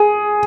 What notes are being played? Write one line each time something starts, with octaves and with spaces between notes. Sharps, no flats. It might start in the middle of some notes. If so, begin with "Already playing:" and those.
Already playing: G#4